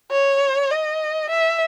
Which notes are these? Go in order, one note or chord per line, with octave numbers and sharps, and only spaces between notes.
C#5
D#5
E5